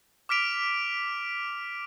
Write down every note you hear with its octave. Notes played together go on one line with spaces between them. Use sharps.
D6 F6 B6 D7 F7